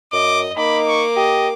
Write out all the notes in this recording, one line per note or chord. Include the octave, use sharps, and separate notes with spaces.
F#2 D#5 D6
A#3 D#4 B5 D6
C#6
G4 D#5